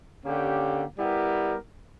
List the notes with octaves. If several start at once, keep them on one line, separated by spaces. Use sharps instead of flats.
D3 A#3 C#4 G4
G3 B3 E4 G4 A#4